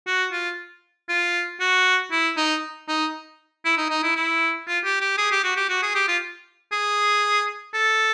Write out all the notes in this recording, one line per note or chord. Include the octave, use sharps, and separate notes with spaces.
F#4
F4
F4
F#4
E4
D#4
D#4
E4
D#4
D#4
E4
E4
F4
G4
G4
G#4
G4
F#4
G4
F#4
G#4
G4
F4
G#4
A4